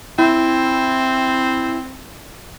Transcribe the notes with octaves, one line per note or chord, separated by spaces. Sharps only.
C4 E4